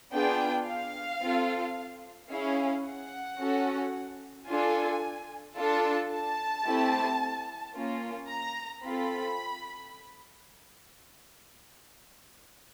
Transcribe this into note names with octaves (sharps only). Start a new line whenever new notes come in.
B3 D4 F4 G#4 G5
F5
C4 F4 A4
C#4 E4 G#4 F5
F#5
C#4 F#4 A4
D4 F4 A4 G#5
D4 F4 A4 A5
A5
A3 C4 E4 G4
A#3 C#4 F4
A#5
C4 F4 A4 B5